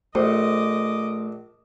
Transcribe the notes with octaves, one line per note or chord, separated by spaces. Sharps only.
A#1 A3 C5 D#5 D6